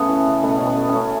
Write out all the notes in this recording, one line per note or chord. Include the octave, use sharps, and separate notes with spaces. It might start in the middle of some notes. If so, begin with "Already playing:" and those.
Already playing: C#3 A3 B3 C#4
E3
C#3
B2 A3
B2 C#4
B3
A3
C#4
A3